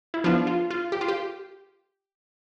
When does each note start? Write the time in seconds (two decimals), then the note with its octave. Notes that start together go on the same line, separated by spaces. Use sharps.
0.14 E4
0.24 F3 B3 D4 F4
0.47 F4
0.70 F4
0.92 G4
1.01 F4
1.08 G4